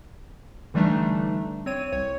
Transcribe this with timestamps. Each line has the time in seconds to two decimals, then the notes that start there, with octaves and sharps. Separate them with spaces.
0.74 D3 E3 G3 A3 D4 D#4
1.66 C4 C#5 D#7
1.92 C2 C#5